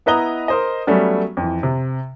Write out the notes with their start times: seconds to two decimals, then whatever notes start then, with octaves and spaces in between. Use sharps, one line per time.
0.06 B3 E4 B4 D#5 A#5 G7
0.48 A#4 C5 D#5
0.87 F#3 G3 A3 B3 C#4
1.37 F2 E3
1.63 C3